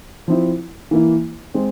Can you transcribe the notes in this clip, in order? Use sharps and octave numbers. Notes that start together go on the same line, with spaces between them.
F3 C4 E4
E3 A#3 E4
G#3 C4